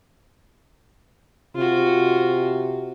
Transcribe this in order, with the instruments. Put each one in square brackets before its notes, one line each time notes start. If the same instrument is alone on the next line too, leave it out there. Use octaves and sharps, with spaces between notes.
[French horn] C3 [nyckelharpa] F4 F#4